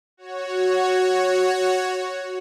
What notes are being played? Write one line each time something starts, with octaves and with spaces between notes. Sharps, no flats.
F#4 C#5